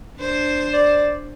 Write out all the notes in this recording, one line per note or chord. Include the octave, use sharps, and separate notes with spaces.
D4 C5
D5